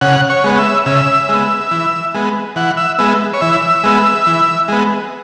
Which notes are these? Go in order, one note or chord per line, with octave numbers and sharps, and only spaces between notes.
C#3 F#5
C#5
G#3 B3
E5
C#3 E5
G#3 B3
E3
G#3 B3
E3 F#5
E5
G#3 B3 E5
C#5
E3 E5
G#3 B3
E3
G#3 B3